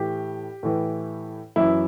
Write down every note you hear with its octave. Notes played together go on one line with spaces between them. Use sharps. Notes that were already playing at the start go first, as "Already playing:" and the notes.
Already playing: A2 E3 G4
A2 E3
F#2 E3 E4